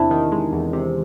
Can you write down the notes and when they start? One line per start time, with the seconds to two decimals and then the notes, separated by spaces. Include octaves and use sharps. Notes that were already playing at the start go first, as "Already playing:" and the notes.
Already playing: E2 C3 D4 E4
0.11 D#3
0.32 G#3
0.52 E2
0.73 C3